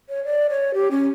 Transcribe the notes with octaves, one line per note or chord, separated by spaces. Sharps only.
C#5
D5
C#5
G4
C#4